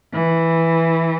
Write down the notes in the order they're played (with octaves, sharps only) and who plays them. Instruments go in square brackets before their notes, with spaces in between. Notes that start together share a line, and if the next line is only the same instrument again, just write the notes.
[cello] E3